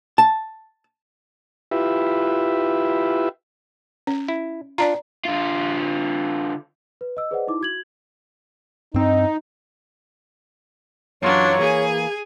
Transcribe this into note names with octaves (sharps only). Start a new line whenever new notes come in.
A5
E4 F4 G4 B4 E5
C#4
E4
D4 F4 D5 A#5
D3 F4
B4
D#5 E6
G#4 B4 C5 D5 D#5 F#5
D#4 E4 D6
F#4 G#6 F#7
G2 C4 D#4
F#2 E3 F#3 D4 F4 C#5
E3 A#3 G#4 G#5